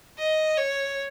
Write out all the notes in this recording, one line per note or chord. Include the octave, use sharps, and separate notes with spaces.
D#5
C#5